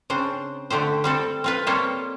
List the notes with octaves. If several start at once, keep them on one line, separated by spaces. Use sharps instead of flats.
C#3 C4 D4 C5
D3 A3 G4 C5
G3 C4 A4
C4 F4 B4
G3 A#3 C4 A4 C5 C#5